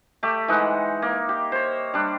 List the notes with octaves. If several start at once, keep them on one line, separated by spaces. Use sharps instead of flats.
A3 G4
E3 G#3 D#4 F#5
A#3
G4
C5 C#5
G3 D4